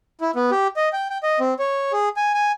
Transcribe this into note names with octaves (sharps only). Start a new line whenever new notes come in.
E4
B3
G4
D#5
G5
G5
D#5
C4
C#5
G#4
G#5
G#5